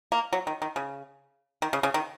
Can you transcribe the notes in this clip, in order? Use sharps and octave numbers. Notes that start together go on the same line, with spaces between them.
A#3
F#3
D#3
D#3
C#3
D#3
C#3
C#3
D#3